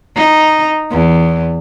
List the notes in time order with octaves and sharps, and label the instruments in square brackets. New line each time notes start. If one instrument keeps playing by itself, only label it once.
[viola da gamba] D#4
E2